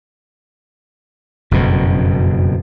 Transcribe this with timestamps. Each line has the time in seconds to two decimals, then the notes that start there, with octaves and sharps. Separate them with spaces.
1.51 F#1 F2 B2